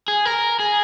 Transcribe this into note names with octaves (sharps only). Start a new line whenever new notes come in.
G#4
A#4
G#4